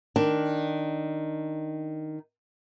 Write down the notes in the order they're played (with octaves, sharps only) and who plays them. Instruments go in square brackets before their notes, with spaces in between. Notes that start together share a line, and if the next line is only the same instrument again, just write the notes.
[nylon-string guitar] D#3 D4